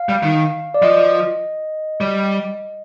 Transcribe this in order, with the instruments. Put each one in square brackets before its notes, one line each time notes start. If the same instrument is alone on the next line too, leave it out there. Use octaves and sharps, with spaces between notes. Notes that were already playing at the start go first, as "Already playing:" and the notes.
Already playing: [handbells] F5
[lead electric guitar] G3
D#3
[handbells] D5
[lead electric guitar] F3 [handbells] D#5
[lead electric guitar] G3